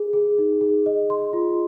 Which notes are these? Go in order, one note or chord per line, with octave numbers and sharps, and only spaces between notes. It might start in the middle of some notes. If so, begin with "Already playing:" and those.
Already playing: G#4
G#4
D#4
G#4
D#5
C6
F4